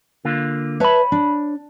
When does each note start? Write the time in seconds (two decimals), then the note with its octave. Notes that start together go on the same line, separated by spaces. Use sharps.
0.25 D3 A#3 F4
0.80 B4 C#5 E5 A5 B5
1.12 D4